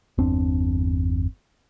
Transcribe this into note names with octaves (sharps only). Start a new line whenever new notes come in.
G1 E2 C4 D4